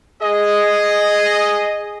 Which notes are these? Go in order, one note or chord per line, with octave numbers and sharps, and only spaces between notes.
G#4 D#5